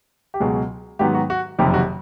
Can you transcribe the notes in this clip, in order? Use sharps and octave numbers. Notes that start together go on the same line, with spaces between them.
G4
C#2 B2 F#3 G#4
G#2 D#3 F#3 B3 G4
F#4
F#4
F#1 F2 C3 D#3 G4
F#4